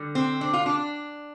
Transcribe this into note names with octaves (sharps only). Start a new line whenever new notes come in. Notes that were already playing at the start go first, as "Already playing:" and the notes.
Already playing: D3 G3
C4
D4
F4
D4